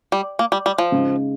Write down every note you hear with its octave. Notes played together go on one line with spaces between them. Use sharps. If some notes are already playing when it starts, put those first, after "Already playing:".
G3
A#3
G3
G3
F3
C#3 G#3 D#4